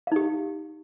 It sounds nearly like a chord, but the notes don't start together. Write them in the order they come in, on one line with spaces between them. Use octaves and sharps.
F5 D#4 G4